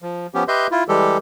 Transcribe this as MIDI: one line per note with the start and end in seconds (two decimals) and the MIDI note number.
0.02 0.27 53
0.34 0.44 53
0.34 0.44 59
0.34 0.44 61
0.34 0.44 67
0.48 0.67 67
0.48 0.67 71
0.48 0.67 75
0.48 0.67 76
0.48 0.67 84
0.48 0.67 91
0.71 0.84 64
0.71 0.84 65
0.89 1.18 52
0.89 1.18 55
0.89 1.18 56
0.89 1.18 67
0.89 1.18 69